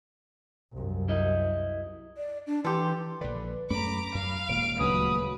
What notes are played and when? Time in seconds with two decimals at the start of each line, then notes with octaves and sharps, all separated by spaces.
0.72 C2 F#2
1.09 E4 D#5
2.17 D5
2.47 D4
2.65 E3 G4 A4 C6
3.21 A#1 D3 B4 D5
3.70 F#2 A3 C#4 A#5 B5 D6
4.15 F#2 F5
4.48 D#1 A#2 G#3 D7
4.79 D2 C#3 F#3 B4 D#6